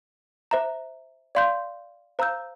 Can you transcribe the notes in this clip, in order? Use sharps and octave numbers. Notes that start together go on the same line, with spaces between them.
C5 E5 A#5
D5 F5 C6 G6
C5 F5 A#5 E6 G6